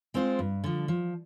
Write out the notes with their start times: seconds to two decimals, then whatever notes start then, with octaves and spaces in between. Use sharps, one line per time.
0.14 G#3 C4 F4 C5
0.39 G2
0.64 D3 F3
0.88 F3